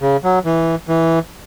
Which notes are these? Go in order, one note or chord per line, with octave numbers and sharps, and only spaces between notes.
C#3
F#3
E3
E3